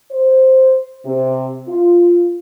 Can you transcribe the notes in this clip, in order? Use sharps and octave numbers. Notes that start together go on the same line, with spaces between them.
C5
C3
F4